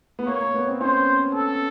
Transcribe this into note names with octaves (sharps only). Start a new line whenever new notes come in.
B3
A#3 C#5
A#3
B3
C4
C#4 C5
A4